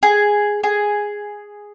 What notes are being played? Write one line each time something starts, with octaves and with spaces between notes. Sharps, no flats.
G#4
G#4